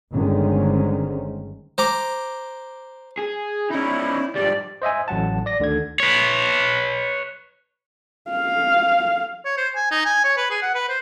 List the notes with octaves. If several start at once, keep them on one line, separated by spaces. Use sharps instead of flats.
G1 D3 D#3 G#3 C4 C#4
C5 A#5 D6
G#4
C#4 D#4 E4
F2 G#2 G3 D5
C5 D#5 E5 G#5
A1 F#3 F#5 A5
D5 A#6
D2 D3 D#3 G#6
B4 C#5
F5
C#5
C5
G#5
D#4
G#5
C#5
B4
G#4
F#5
B4
C5